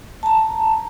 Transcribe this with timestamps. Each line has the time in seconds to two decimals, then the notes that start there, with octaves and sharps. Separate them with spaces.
0.23 A5 A#5